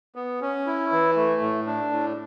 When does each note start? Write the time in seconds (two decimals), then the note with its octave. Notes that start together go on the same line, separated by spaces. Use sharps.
0.15 B3
0.41 C#4
0.66 E4
0.92 E3
1.16 A3
1.41 A2
1.67 D4
1.92 A2